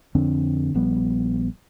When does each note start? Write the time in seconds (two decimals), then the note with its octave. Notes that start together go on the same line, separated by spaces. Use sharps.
0.15 F2 D3 C4 D4
0.74 A#1 F3 G3 B3